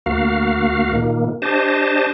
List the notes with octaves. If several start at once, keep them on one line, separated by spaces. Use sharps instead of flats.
D2 A#3 F#4 F5
A#2 D#3 A#3
D4 G4 C5 D#5 A5